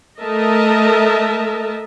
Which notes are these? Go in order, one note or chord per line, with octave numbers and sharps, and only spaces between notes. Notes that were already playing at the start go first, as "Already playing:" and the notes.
A3 A#4 D#5 E5 A5